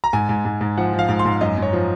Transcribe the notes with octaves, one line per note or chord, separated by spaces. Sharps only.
A#5
G#2 G#5
G#2
G#2
G#2
F3 F#5
F3
F5
G#2
C6
G#2
F#2 D#5
F#2
C#5
F3